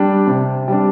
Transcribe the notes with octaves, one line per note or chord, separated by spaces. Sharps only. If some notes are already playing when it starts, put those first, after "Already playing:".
Already playing: G3 D4
C3
G3 D4